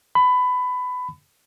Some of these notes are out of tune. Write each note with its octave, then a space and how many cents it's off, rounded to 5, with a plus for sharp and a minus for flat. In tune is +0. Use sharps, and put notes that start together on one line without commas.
B5 +20